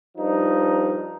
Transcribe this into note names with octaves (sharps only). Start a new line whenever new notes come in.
G2 F3 D#4